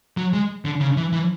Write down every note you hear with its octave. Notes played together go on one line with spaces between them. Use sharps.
F#3
G#3
D3
C#3
E3
E3